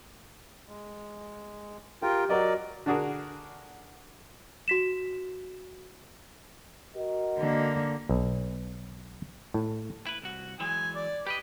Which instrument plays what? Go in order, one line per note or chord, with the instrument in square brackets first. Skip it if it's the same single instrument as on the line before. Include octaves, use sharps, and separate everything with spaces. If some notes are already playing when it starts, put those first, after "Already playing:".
[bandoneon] G#3
[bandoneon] F4 A#4 G5 [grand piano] G4
[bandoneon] F#3 D5 [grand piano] F#4 A#4 D#5
[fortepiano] D3 D4 F#4 G#4 A#4
[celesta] F#4 B6 E7
[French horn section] F#4 A#4 D#5
[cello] D3 A#3
[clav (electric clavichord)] B1
A2
[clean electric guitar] E4 B4
C2 F#4
[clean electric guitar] E3 F#3 G#3 [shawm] G#5
[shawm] D5
[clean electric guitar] G4 D5 D#5 [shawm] B4